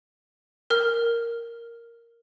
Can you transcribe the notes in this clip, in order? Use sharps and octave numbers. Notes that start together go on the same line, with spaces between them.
A#4 F6